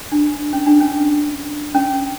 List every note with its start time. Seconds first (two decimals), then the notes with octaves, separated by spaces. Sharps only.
0.12 D4
0.53 C#4
0.66 D4
0.80 C#4
1.75 C#4